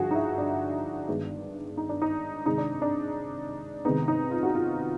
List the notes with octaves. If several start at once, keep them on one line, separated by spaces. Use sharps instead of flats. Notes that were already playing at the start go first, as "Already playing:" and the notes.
Already playing: G2 D3 F3 F#4 G#4
D#4
E4
D4
G2 D#3 G#3 B3
D#4
D4
D#4
C3 D#3 G#3 D#4
D4
D4
C3 D#3 G#3 B3 D#4
D#4
F4
F#4
F4